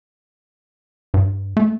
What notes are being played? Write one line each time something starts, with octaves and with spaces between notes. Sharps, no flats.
G2
A3